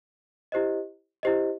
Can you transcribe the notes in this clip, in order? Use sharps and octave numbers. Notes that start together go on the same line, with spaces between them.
E4 G4 C5 D#5
E4 G4 C5 D#5